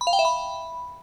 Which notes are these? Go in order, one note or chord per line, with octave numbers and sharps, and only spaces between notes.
B5
F5
G5
E5
B5